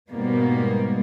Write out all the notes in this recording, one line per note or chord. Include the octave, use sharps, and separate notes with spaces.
G#2 B2 G3 G#3 A#3 B3